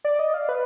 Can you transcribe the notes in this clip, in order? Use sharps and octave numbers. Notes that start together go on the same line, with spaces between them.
D5
D#5
F5
B4